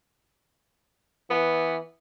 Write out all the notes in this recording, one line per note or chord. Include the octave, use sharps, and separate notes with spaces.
E3 B3